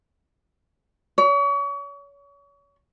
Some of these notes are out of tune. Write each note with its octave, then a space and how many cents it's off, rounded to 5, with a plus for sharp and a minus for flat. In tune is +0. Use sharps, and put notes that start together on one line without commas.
C#5 +35